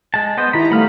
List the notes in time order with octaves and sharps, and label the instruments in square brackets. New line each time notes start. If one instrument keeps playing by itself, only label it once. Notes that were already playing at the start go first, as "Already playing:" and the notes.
[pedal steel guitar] G#3 A5
B3 C5 D#5
[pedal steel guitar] D#3 B5 [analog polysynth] E4 G4 A#5
[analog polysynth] G3 A3 F5 [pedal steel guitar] B3 B5 F6